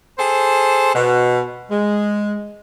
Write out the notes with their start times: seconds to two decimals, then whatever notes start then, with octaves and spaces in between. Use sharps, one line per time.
0.19 G#4 A4 C5
0.95 B2
1.71 G#3